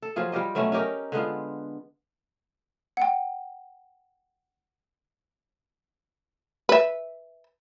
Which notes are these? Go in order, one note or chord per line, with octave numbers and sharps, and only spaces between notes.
A4
F3 F#3 F4 G#4
G3 F4 G4 D#5
B2 F#3 A3 C#4
C#4 D#4 G4 A#4
D3 G#3 B3 F4
F#5 G5
B4 E5